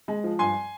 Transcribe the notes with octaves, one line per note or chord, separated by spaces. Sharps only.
G#3
F3
G2 G#5 C6